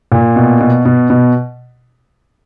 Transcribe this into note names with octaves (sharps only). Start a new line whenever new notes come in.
A#2
B2
B2
B2
B2